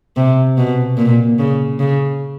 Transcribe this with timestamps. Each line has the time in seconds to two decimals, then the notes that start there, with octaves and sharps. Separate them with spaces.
0.16 C3
0.57 B2
0.97 A#2
1.39 C#3
1.79 C#3